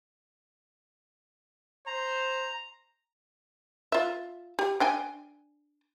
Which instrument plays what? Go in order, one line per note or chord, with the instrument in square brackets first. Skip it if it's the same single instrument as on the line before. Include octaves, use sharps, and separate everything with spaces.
[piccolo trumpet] C5 [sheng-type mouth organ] A#5
[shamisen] F4 E5
G4
D4 G5 G#5